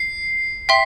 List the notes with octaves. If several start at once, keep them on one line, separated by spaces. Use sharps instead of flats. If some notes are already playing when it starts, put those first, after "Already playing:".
Already playing: C7
E5 G5 C6 B6